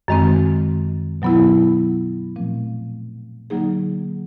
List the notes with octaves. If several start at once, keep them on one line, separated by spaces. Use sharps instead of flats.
F#2 D#3 G#3 C4
B2 F#3 B3 E4
A#2 F3 A3 C4
D3 F#3 A#3 D#4 G#4